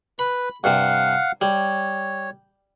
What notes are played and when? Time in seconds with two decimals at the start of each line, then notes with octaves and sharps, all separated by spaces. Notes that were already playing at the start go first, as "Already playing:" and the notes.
0.19 B4 B5
0.64 G2 C3 F5 F#5
1.41 G3 C#5